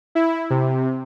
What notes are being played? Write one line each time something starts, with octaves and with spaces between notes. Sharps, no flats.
E4
C3